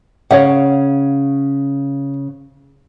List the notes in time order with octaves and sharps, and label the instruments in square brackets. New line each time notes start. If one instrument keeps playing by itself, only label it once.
[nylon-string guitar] C#3 [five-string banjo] C#5 F5 F#5